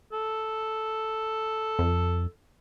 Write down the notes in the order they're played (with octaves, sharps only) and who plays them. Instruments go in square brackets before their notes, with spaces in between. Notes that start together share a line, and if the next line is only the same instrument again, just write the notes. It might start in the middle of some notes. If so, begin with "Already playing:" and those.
[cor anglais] A4
[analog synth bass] F2